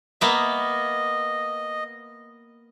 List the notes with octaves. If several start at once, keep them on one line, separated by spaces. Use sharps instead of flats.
A#3 B3 D#5 E5